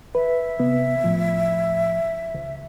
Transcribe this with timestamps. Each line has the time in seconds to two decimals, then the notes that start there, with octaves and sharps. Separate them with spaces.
0.15 B4 E5
0.59 C3 B3
1.04 A2 F3
2.35 C#2